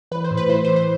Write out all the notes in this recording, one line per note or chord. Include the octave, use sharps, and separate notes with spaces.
E3 B4
C5
A2
B4
E3 C5
C5
E3
C5